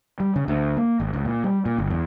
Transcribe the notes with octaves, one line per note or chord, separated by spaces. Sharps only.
G3
C#3
D2
A#3
G#1
C#2
A#2
G3
A#2
G1
E2